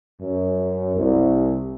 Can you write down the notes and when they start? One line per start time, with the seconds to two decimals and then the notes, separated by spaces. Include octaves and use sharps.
0.19 F#2
0.96 C2